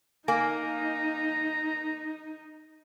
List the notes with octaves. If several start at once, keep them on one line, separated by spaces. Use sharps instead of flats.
A#3 D#4 G#5 A#5